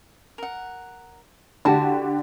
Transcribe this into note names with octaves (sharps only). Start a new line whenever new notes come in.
A#4 F#5
D3 E4 F#4 G4 A5